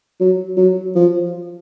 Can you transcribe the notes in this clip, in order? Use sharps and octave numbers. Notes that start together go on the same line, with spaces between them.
F#3
F#3
F3